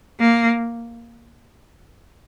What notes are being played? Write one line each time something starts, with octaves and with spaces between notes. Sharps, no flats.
A#3